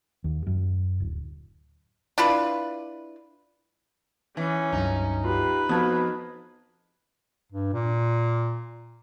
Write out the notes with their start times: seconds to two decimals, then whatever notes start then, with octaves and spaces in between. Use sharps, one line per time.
0.24 D#2
0.47 F#2
1.00 D1
2.18 D4 E4 F4 B4
4.37 E3 C#4
4.73 C#2 G2 F#3 D#4
5.24 F4 G4 B4
5.69 F2 B3 F#4 A5 D#6 G#6
7.53 G2
7.73 A#2